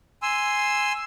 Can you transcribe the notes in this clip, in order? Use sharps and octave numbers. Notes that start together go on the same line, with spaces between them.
G#5 C6 E6